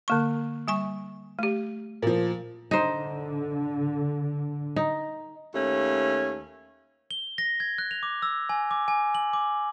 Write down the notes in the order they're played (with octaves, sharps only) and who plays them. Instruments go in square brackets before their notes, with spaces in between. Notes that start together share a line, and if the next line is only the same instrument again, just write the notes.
[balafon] D3 A#3 C#6
G3 G#5 C#6
A3 G4
[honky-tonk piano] A#2 F3
[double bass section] D3 [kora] D#4 C5
[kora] D#4
[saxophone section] D#2 A3 C#4
[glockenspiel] G7
A#6
G#6
F#6
F7
D6
E6
G#5
D6
G#5
F#7
D6